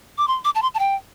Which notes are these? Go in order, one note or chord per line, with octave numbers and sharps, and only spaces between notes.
D6
C6
D6
A5
C6
A5
G5